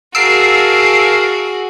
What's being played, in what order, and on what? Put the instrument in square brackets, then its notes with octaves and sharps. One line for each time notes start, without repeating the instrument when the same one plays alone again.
[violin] F#4 G#4 [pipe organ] A#4 F5 A5 [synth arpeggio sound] E6 C7 D7